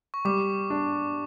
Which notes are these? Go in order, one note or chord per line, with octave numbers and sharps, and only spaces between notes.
C#6
G3 D6
D4